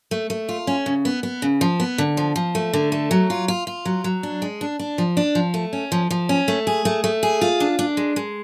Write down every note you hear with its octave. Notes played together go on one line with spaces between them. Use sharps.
A3
A3
F4
C#4
C#3
B3
B3
C#3
F3
B3
D3
F3
F3
A3
D3
A3
F#3
F4
F4
F4
F#3
F#3
D4
G#3
D4
D4
F3
D4
F3
A3
C#4
F3
F3
C#4
A3
G#4
A3
A3
G#4
F4
D4
D4
G#3
G#3